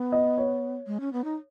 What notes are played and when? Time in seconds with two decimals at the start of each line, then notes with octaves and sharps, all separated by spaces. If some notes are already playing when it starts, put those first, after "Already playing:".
Already playing: B3
0.12 D#5
0.38 C#5
0.87 G#3
1.00 C#4
1.13 B3
1.24 D#4